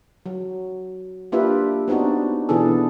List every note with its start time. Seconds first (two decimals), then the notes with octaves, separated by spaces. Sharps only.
0.26 F#3
1.32 A#3 D4 F4 G4 B4 E5
1.88 B3 C4 D4 D#4 F#4
2.49 B2 E3 B3 D4 G#4 A4